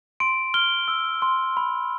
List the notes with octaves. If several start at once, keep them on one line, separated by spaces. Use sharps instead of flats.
C6 D7
F6 G7
E6
C6
B5